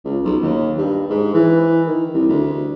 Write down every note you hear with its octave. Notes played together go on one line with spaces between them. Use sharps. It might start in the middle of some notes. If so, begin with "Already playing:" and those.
C#2
B1
D#2
G2
G#2
E3
D#3
C2
D2